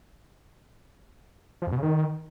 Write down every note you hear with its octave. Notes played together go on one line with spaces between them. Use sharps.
F3
F2
B2
C#3
D#3